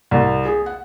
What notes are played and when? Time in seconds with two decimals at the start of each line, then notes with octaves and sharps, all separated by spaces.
0.11 C2
0.45 G#4
0.66 F#5